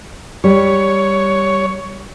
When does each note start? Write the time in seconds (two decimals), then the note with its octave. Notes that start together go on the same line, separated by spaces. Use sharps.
0.44 G3 C#5